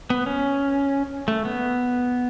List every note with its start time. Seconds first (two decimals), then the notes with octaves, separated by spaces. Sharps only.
0.10 B3
0.26 C#4
1.28 A3
1.45 B3